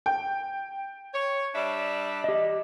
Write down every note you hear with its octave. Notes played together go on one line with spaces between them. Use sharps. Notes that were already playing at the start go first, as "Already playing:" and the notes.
G5
C#5
G3 D4 E5
G4 D#5